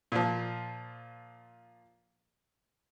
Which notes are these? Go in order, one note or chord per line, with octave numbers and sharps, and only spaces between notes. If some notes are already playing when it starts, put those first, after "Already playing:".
A#2 F3